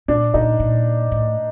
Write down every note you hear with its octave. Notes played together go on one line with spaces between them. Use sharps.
A#2 D4 D5
A#2 D#4 D#5
A#2
A2